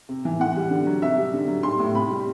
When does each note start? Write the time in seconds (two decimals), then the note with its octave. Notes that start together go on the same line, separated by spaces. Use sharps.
0.09 C3
0.25 E3
0.40 E3 F#5
0.56 G3
0.71 D3
0.87 F#3
1.02 C3 E5
1.18 G3
1.33 D3
1.48 F#3
1.63 G3 C6
1.79 A2
1.94 C3 B5
2.10 G3